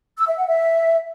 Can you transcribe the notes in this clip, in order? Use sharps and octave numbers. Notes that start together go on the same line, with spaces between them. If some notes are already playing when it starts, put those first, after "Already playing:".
E6
E5
F#5
E5